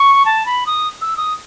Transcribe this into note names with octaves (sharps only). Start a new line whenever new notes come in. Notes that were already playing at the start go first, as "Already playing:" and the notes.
Already playing: C#6
A5
B5
D#6
E6
D#6